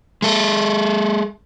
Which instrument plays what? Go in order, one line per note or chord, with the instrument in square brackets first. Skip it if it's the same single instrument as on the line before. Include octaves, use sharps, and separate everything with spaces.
[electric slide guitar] G#3 A4